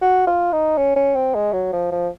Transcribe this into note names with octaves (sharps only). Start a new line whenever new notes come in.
F#4
F4
D#4
C#4
C#4
C4
G#3
F#3
F3
F3